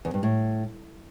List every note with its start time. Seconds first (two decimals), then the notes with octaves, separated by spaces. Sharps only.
0.05 E2
0.14 G2
0.23 A2